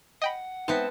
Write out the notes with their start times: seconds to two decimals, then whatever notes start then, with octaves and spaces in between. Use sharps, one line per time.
0.22 D#5 F#5 G5 B5
0.68 G#3 B3 C4 D#4 E5 A5